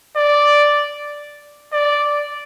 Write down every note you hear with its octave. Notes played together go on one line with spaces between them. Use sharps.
D5
D5